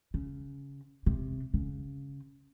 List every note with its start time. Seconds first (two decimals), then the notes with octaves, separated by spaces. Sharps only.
0.14 C#3
1.06 C3
1.54 C#3